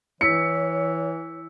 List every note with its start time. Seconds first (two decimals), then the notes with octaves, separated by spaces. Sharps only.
0.21 E3 E4 C#5 E6 B6 C#7